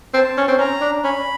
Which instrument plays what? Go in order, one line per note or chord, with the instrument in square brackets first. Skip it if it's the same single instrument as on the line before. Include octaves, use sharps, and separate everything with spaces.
[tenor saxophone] C4 [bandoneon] A5
[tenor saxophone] C#4
C4
[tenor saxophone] C#4 [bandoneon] A#5
[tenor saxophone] D4
[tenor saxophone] C#4 [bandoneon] B5